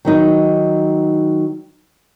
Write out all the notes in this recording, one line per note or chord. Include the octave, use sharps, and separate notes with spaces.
D#3 F#3 D#4